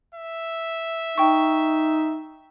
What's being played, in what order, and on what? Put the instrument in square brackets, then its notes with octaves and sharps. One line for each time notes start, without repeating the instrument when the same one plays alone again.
[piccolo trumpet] E5
[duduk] D#4 [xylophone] G5 C#6